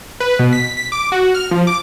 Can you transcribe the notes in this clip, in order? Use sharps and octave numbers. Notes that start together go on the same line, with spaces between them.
B4
B2
B6
B6
D6
F#4
F6
F3
D6